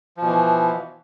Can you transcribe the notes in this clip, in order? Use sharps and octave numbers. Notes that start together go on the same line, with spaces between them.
B2 E3 F3